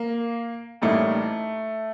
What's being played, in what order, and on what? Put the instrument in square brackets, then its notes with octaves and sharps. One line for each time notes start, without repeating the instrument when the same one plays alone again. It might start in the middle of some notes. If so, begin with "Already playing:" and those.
Already playing: [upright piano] A#3
[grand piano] A1 A2 G3 A#3 D#4 [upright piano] A3